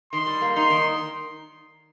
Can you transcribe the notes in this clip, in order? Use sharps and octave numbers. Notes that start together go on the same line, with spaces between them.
D#3 C6
G3
A#3
D#4 C6
D#3